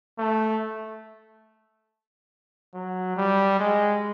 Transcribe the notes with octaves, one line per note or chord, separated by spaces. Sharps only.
A3
F#3
G3
G#3